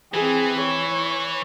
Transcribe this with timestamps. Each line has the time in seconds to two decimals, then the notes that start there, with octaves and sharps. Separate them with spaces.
0.14 E3 C4 G#4
0.61 C#5